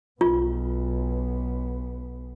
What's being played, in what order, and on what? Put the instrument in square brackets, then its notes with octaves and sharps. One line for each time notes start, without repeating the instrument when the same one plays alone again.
[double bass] B1 B3 [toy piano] F4